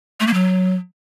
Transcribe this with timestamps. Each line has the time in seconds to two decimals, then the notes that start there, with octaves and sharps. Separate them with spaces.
0.20 A3
0.27 A#3
0.34 F#3